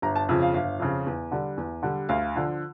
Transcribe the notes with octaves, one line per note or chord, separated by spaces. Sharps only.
G1 A#5
A5
F2 C#3 F3
F5
G1 F5
F2 C#3 F3
E2
D3 G3
E2
D3 G3
D2 F5
D3 F3